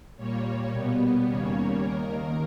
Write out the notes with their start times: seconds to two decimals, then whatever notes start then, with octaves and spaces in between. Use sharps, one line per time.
0.17 A#2 G3 A#3 C#5
0.71 B2 G3 B3
1.26 D#2 C#3 G3 A#3 C#5
1.80 D#2 D#3 A#3 A#4